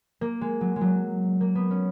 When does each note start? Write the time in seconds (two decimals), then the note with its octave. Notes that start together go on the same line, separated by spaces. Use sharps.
0.21 A#3
0.41 G#3
0.61 F#3
0.76 G#3
0.81 F#3
1.41 A#3
1.55 B3
1.71 C#4